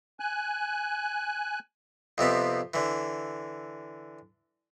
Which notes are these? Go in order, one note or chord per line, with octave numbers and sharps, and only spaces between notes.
G#5 F#6
F2 C3 B3 D5
D3 E3